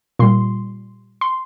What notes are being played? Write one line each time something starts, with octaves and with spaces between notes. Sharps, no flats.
A#2 G3 C6
C6